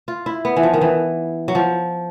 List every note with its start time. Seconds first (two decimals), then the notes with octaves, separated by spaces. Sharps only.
0.08 F4
0.26 E4
0.45 B3
0.56 E3
0.63 F3
0.73 D#3
0.81 E3
1.48 F#3
1.55 F3